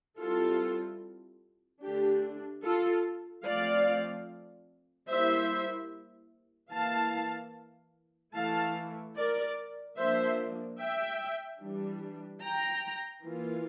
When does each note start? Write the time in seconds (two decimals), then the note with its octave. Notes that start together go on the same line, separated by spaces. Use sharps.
0.18 G3 C4 E4 F4 A4
1.82 D3 A3 D4 G4
2.64 F4 A4
3.45 F3 A3 C4 F4 D5 F5
5.08 G3 A#3 E4 C5 E5
6.72 E3 A#3 E4 F5 A5
8.35 E3 A3 E4 F5 A5
9.17 A#4 D5
9.98 F3 A#3 D4 C5 E5
10.80 E5 G5
11.62 E3 G3 D4
12.43 G5 A#5
13.25 E3 A#3 F4